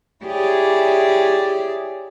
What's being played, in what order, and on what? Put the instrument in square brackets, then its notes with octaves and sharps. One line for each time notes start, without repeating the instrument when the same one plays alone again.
[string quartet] E4 G4 G#4 C#5 D5